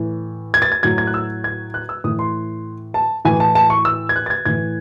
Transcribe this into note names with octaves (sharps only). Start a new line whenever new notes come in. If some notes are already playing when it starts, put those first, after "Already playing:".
Already playing: A2 E3
G#6
A6
G#6
A2 F#3 G#6
G#6
F#6
E6
G#6
F#6
E6
A2 E3 D#6
C6
A5
A2 E3 G#5
A5
A5
C#6
E6
G#6
F#6
A6
G#6
A2 E3 G#6